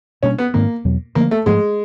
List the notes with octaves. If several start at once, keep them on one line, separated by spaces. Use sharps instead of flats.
B2 G3 A#3 C#4 D4
B3
G#2 D#3 G#3 A#3 C4
E2 B2 F#3
D3 F3 A3 A#3
A3
G#2 F3 G#3 A3